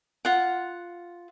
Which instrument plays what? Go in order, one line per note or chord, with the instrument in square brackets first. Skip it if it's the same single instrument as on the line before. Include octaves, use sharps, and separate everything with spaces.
[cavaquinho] F4 F#5